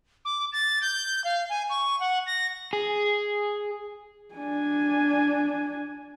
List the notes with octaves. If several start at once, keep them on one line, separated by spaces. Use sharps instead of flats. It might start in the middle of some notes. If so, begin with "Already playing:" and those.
D6
A6
G6
F5
G#5
C#6
F#5
A#6
G#4
D4 G#5